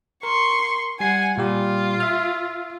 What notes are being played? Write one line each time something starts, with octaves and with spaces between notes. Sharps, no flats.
A#4 C6 C#6
G3 F#5 G#5 C7
A#2 G3 F4 G4
E5 F6